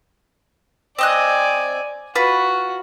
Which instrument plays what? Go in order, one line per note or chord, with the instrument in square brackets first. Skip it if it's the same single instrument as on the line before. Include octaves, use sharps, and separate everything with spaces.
[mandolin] C4 D#5 F#6 [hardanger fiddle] D5 G#5
[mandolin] F4 B4 [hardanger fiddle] F#4